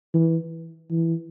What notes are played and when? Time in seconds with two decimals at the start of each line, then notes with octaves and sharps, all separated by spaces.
0.14 E3
0.91 E3